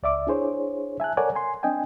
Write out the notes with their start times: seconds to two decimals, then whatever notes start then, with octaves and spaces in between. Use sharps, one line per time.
0.03 C#2 D5 E5 D6
0.27 D4 E4 G#4 C5 C#5
1.00 E5 G#5 A5 F#6
1.17 A4 A#4 C#5 D5 F#5 G#5
1.35 G#5 C6
1.63 C4 D4 D#5 G5 G#5